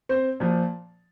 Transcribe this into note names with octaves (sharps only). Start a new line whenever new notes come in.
C4 C5
A#2 F3